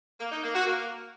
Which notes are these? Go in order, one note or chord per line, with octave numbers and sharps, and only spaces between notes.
A#3
D#4
A#3
F#4
A#3